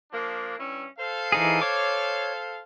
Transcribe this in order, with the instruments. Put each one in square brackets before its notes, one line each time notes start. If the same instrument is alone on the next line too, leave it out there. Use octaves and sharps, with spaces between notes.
[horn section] F3 A#3 D4
G2 C#4 E4
A4 C5 F5
[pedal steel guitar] E3 D#4 G#4
C#5 D6